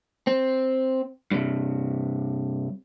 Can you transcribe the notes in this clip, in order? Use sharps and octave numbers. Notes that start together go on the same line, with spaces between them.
C4
G2 C3